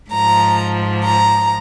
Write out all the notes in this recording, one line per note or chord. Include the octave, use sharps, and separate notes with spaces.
G#2 F3 A#5
A#5